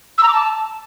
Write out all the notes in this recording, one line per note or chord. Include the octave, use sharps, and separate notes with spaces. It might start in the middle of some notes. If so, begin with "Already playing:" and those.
E6
A#5
D6
A5